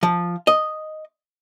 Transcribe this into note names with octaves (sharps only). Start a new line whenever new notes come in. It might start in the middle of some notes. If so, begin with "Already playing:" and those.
F3
D#5